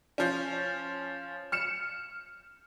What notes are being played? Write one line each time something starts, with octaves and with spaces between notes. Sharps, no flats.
F3 C#4
F6 C#7 E7